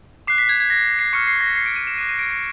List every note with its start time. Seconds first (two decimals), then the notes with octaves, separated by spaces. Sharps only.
0.27 D6 F#6 C7
0.38 B6
0.49 G#6
0.60 G#6
0.70 A#6
0.99 C7
1.13 C#6 F6 C#7
1.27 C7
1.41 A#6
1.56 C7
1.66 D7
1.76 D#7
1.87 E7
1.98 D6 F#6 D#7
2.09 D#7
2.19 D7
2.30 C7